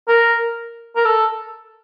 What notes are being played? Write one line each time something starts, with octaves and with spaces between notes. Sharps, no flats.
A#4
A#4
A4